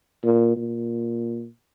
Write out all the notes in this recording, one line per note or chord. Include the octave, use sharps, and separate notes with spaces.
A#2
A#2